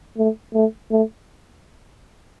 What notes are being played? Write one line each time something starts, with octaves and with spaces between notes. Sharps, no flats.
A3
A3
A3